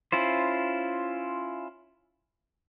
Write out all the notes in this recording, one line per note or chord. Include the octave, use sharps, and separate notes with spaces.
C#4 E4 F4 C5